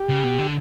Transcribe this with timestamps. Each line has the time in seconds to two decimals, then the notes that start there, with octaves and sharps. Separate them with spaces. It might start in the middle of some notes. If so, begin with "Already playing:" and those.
Already playing: G4
0.09 C#3
0.24 B2
0.38 D3